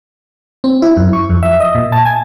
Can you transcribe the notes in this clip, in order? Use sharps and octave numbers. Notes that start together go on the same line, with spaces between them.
C4
E4
F#2
C#6
F2
E5
D#5
A#2
A5
G#5